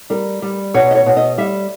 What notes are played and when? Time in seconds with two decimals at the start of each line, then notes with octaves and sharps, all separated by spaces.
0.10 G3 A#4
0.42 G3
0.74 B2 C#5
0.91 D#5
0.95 C#5
1.06 B2
1.17 D#5
1.38 G3 E5